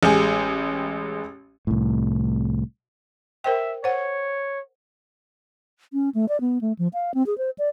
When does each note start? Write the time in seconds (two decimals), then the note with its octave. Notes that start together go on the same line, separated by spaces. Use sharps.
0.03 A1 G#3 G4 G#5
1.67 C2 A2
3.44 A#4 C5 E5 G5
3.84 C5 C#5 F#5
5.93 C#4
6.15 A3
6.29 D5
6.41 B3
6.61 A3
6.79 F3
6.94 F5
7.14 C4
7.26 G#4
7.38 C5
7.58 D5